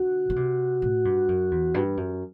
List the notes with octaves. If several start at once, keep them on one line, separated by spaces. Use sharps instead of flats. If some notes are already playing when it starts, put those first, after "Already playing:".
Already playing: D3 F#4
D3
C3
A2
G2
F#2
E2
G2
F#2